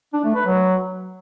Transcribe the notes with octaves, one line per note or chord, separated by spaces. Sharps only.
D4
A3
B4
F#3